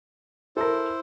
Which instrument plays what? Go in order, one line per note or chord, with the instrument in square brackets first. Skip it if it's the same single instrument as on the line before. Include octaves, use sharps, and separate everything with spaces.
[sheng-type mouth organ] E4 C5 [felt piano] A4 A#4